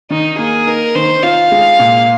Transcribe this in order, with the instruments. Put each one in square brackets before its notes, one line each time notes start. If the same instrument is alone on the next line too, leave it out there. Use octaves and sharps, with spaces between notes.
[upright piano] D#3 [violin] D#4
[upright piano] A#3 [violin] G#4
[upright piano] D#4 [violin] A#4
[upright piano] D#3 [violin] C5
[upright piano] F4 [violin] F5
[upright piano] G#3
A#2